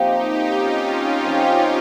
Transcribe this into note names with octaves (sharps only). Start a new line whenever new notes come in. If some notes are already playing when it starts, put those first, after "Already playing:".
Already playing: C3 F3 A#3 D#4 G4
C#4 F4
C#3 F3 C4 G4